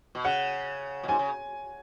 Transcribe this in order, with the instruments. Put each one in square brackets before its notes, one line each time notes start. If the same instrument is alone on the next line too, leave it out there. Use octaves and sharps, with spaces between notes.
[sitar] B2
[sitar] C#3 [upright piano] F#5
[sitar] B2
[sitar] G#2 [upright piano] G#5
[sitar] C#3